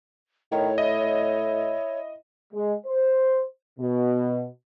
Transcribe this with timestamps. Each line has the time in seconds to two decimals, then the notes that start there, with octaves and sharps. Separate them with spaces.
0.52 A2 D#3 C#5
0.78 E4 D#5
2.53 G#3
2.86 C5
3.79 B2